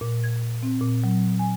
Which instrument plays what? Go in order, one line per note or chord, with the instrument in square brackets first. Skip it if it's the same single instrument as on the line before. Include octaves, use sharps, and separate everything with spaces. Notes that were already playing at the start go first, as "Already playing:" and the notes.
[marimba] A#2
G#6
C4
A#2
F#3
G#5